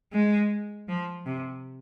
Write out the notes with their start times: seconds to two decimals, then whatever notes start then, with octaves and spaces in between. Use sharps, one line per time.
0.13 G#3
0.89 F3
1.26 C3